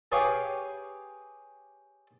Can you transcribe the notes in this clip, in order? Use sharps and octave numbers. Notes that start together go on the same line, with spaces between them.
G4 G#4 B4 C#5 F5